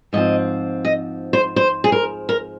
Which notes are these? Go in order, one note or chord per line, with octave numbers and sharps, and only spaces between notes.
G#2 F3 C4 D#5
D#5
C5
C5
G#4
A#4
A#4